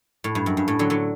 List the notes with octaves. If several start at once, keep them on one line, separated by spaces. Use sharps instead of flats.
A2
G2
F#2
G2
A2
D3 F#3
D3 F#3